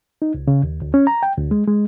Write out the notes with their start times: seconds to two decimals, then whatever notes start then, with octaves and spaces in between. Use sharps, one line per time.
0.22 D#4
0.34 C#2
0.47 C#3
0.63 D#2
0.82 D2
0.94 C#4
1.07 A#5
1.23 G5
1.38 D2
1.51 G#3
1.68 G#3